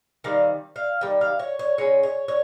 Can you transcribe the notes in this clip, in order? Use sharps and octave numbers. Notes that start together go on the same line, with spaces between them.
D#3 G3 C4 F5
F5
D#3 G3 G5
F5
C#5
C#5
C#3 G#3 C#4 C#5
C#5
C#5